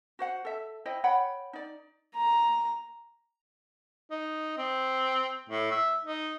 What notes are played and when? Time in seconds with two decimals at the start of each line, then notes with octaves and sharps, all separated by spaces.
0.19 F#4 C5 F#5
0.45 A4 E5
0.85 E4 C5 D#5 G5
1.04 C#5 F#5 G5 B5
1.53 D#4 D5
2.16 A#5
4.11 D#4
4.58 C4
5.49 A2
5.71 E5
6.04 D#4